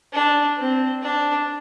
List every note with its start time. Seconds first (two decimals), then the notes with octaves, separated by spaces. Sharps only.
0.13 D4
0.58 C4
1.02 D4